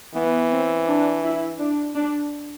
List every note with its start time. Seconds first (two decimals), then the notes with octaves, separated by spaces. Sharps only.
0.15 E3 B3
0.51 C4
0.87 D4
1.23 E4
1.59 D4
1.95 D4